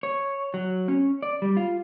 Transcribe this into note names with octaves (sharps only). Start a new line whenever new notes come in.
C#5
F#3
C#4
D5
G3
F4